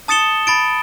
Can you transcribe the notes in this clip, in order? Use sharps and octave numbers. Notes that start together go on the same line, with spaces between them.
A5 D#6 A6 C#7 E7 G7
B5 A6 D7